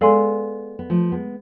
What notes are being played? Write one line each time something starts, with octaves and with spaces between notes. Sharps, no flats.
G#3 B3 A4 D5 F5 G#5 C6
B3
F3 A3
G#3 B3